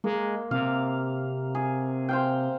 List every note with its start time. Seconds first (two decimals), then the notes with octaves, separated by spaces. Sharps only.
0.04 G#3 A#3
0.51 C3 F5
1.55 G#4
2.09 C5 F5 G5